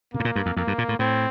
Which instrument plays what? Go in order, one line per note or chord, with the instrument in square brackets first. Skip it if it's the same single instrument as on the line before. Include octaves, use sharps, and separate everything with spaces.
[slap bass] C3 [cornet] A#3
[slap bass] A2
A#2
G2
F2
[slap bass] F2 [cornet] A#3
[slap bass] G2
A#2
A2
[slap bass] A2 [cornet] C4